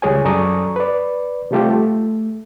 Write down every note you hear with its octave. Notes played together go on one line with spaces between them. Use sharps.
C#2 G3 G#4 C#5 G#5
F#2 A4 D5 A#5 C#6 D#6
B4 D5
C3 G3 A3 F4 G4
A3